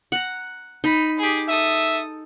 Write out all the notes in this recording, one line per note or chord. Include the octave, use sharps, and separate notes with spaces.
F#5 A#5
D#4 B5
G4 G#4
A4 E5 D#6